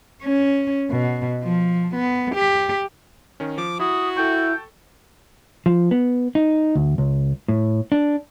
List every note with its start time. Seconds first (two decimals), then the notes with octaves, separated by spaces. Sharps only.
0.24 C#4
0.90 B2
1.44 F3
1.95 B3
2.35 G4
3.40 D#3 C#4
3.58 F3 D6
3.80 E4 F#4 D#6
4.17 E4 A4 G5 C#6 G6
5.66 F3
5.91 B3
6.35 D#4
6.76 D2
6.98 C#2
7.48 A2
7.92 D4